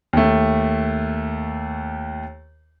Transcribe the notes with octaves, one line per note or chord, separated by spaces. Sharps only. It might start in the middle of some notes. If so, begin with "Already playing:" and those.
D#2 A3